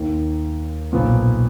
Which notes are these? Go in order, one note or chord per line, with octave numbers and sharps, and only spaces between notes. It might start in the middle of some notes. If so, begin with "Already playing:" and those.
Already playing: D#2 D#3 A#3
B1 A#2 F3 B3